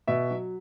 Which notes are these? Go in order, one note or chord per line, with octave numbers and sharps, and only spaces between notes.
B2 E5
F#3